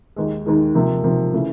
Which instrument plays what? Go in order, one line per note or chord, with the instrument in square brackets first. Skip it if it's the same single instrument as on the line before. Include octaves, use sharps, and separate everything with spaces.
[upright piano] D#2 D#3 G#3
D#2 D#3 G#3
C3 F3 A#3
C3 F3 A#3
C#3 E3 A3